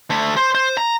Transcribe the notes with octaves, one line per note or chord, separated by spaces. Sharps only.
D2 A3
C5
C5
A#5